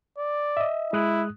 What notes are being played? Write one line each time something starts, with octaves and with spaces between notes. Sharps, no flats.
D5
D#5 E5
G#3 E4 D#6 F#6